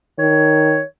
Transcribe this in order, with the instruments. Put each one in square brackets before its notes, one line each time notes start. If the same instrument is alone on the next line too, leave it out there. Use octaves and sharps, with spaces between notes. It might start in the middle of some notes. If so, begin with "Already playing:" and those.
[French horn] D#3 [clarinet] C#5